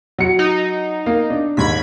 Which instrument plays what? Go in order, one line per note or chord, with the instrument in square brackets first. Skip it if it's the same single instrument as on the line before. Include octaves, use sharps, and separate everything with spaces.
[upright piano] F#3 C#7
[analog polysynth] D#4
[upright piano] A#3
D4
[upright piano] D#2 G#2 [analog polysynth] B5 G#6 B6